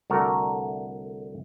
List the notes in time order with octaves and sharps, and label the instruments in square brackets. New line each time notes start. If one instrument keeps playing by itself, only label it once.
[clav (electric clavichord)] C2 D3 A3 F#4 A#4 D5